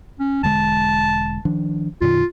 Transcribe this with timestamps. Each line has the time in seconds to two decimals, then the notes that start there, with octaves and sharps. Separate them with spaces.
0.19 C#4
0.43 E1 D3 G#3 A5
1.45 D#3 F3 D4
2.01 F#2 B2 D#3 F4